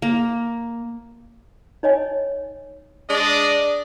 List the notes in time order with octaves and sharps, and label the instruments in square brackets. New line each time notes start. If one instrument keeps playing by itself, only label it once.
[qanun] A#3
[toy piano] D#4 C#5 D#5 G#5
[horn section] G#3 D4 D5 D#5